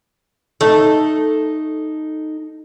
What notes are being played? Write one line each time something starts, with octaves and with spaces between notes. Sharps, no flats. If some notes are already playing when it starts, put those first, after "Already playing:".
A3 D#4 A4